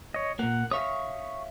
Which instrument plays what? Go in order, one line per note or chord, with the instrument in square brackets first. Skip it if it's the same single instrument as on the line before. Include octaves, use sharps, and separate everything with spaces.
[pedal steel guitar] C#5 D#5
[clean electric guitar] A#2 A#3 [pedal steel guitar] F#5
[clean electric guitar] C#5 E5 F5 [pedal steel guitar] C#6 D#6